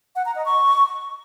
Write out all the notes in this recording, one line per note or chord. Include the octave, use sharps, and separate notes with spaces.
F#5
A#5
D#5
C#6